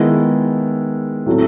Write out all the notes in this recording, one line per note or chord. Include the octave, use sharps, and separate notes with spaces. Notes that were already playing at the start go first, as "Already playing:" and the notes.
Already playing: D#3 G#3 B3 E4
A2 F#3 A3 C4